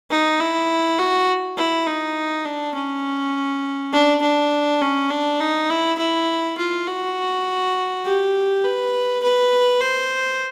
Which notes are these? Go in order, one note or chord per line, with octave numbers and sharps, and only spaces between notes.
D#4
E4
F#4
E4
D#4
D4
C#4
D4
D4
C#4
D4
D#4
E4
E4
F4
F#4
G4
B4
B4
C5